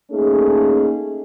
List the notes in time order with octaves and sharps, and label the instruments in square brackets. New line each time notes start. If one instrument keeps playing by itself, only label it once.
[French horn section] A3 A#3 C#4 D#4 G#4